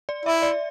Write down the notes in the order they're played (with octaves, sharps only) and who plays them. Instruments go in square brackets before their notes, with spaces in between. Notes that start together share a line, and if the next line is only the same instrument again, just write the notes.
[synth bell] D5
[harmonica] E4 [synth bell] E5
[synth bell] D5